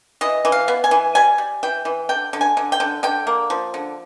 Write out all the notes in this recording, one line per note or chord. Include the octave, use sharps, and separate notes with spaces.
E3 D#5
E3
F5
B3
G#5
E3
G3 G#5
G3
E3 G5
E3
D3 G5
D3
G#5
D3
G5
D3
D3 G5
A#3
F3
D3